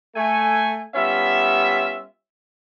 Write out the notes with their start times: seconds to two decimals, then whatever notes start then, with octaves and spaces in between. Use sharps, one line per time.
0.16 A3 G#5
0.95 G3 B3 C#4 F4 E5